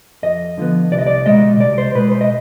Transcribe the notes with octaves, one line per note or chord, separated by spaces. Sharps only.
F2 D#5
D3 F3 B3
C2 D5
D#5
D5
B2 G#3 D#5
C2 D5
C5
B2 G#3 B4
C5
D#5